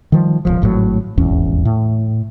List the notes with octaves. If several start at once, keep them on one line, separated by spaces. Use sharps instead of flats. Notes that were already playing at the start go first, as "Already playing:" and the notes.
D#3 F3 G3
D1 G1 F3
G#1 A2 F3 F#3
D#1 G#1 E2 C#4
A2